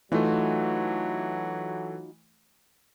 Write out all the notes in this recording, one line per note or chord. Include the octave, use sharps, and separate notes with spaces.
E3 F#3 A3 D#4 F4 F#4